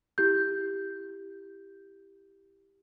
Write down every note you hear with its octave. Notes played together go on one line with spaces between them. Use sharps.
E4 G4 G6